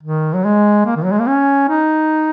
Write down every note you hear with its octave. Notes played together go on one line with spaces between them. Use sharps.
D#3
F#3
G#3
A#3
D#3
F#3
G#3
A#3
C#4
D#4